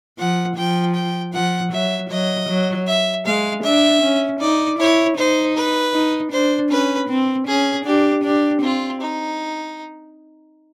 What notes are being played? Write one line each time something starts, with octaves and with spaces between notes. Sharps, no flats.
F3 F#5
F3 G5
G5
F3 F#5
F#3 E5
F#3 D#5
F#3
E5
G#3 F5
D4 E5
C#4
D#4 D5
E4 C#5
D#4 C5
B4
D#4
D4 C5
C#4 B4
C4
C#4 G#4
D4 G4
D4 G4
C4 F4
D#4